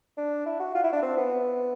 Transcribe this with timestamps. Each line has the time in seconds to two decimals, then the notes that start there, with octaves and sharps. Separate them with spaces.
0.17 D4
0.46 E4
0.60 F#4
0.75 F4
0.84 E4
0.93 D4
1.03 C4
1.17 B3